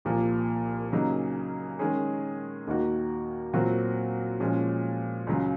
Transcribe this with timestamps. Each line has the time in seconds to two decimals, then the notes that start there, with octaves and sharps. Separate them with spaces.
0.05 C2 A#2 F3 A#3
0.92 C#3 F#3 A#3 D#4 G#4
1.79 D#3 G#3 C#4 G#4
2.67 D#2 D#3 A#3 D#4 F#4
3.53 A#2 F#3 C4 F#4 A#4
4.40 A#2 F3 G#3 C#4
5.27 C#2 C#3 F#3